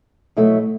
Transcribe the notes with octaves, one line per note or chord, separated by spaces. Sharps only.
B2 F#3 A3 E4